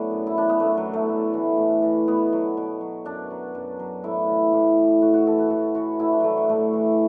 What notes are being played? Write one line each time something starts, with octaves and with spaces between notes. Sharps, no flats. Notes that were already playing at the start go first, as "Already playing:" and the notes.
Already playing: A2 F#3 B3 D4
F#2
E4
E3 D4
B3
F#2 A3
F#3
E3
A3
A2
E3
A2
E3
B2 B3
F#3
B2
F#3
F#2 D4
F#3
F#2
F#3
A2 E4
E3
A2
E3
A2 F#4
F#4
E3 A4
F#4
A2 A4
E3 F#4
A2 E4
D4
E3 F#3 A3
F#3
A2 A3
E3